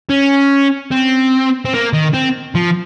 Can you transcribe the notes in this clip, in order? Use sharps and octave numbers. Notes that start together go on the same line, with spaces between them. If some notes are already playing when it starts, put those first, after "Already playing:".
C#4
C4
C4
A#3
D#3
C4
F3